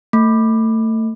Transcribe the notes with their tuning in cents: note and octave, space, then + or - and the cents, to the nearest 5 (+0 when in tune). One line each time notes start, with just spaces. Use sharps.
A3 +25